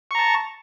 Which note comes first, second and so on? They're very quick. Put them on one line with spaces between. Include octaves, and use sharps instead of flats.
C#6 A#5 A5